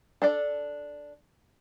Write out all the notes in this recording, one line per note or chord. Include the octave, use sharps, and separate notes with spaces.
D4 A4 D5